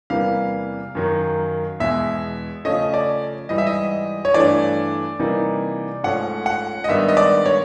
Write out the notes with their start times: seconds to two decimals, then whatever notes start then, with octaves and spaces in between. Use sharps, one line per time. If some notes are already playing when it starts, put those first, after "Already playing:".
0.10 E2 C3 E3 G3 A#3 F5
0.95 F#2 D#3 F#3
1.80 E2 B2 G#3 E5
2.65 C#3 F3 A3 C#4 D#5
2.94 D5
3.49 G#2 E3 G3 D#5
3.58 E5
3.67 D#5
4.25 C#5
4.34 G2 E3 A3 D4 D5
5.19 C3 E3 G3 A#3 D#4
6.04 G#2 F3 A3 C#4 F#5
6.46 F#5
6.84 D#5
6.88 G#2 D#3 G3 B3 D4 E5
7.08 D#5
7.17 D5
7.46 C#5